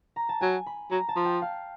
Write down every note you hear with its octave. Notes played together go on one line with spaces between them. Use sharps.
A#5
A5
F#3 G#5
B5
F#3 A#5
A5
F3
G5
F5